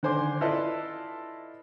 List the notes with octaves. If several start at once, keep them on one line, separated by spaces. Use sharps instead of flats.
D3 D#3 C5 G#5 D6
E4 F4 A4 B4 D5 D#5